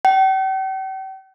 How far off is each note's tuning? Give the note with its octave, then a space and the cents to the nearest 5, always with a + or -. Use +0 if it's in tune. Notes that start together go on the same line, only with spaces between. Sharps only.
G5 -45